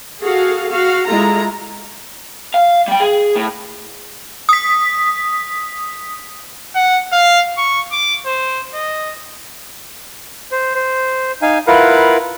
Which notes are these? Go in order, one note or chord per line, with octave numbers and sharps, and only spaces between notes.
F#4 G#4 A4 F5
F#4 F5
G#3 E4 F4 A4 A#5
F5
G3 G5
G#4
A2
D#6 B6
F#5
F5
C#6
D6
C5
D#5
C5
C5
D#4 F5 G#5
E4 F4 A#4 B4 F5 F#5